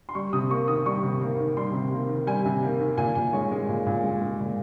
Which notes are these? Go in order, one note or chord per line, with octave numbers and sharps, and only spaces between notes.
C6
G3 C#6
C3 D#6
A#3 C#6
D#3 D#6
G3 C#6
C3
A#3
D#3
G3 C6
C3
A#3
D#3
G3 G#5
C3
A#3
D#3
A#2 G#5
A#2 G#5
G#3 C#5
G#3
A#2
A#2
G#3
G#3
A#2